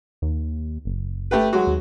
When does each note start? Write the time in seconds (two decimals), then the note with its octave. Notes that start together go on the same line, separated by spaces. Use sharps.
0.22 D#2
0.85 F#1
1.31 A3 G4 B4
1.53 F#3 G#3 F#4
1.67 D#2